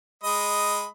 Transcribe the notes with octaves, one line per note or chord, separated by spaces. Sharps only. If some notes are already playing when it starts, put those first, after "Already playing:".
G#3 D#5 B5